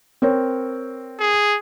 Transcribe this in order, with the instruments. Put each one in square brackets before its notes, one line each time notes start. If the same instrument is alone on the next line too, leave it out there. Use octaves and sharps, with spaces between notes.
[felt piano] C4 A#4 C#5
[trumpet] G#4